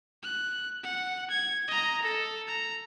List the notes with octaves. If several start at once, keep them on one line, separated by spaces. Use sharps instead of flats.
F#6
F#5
G#6
D#5 A#5
A4
A#5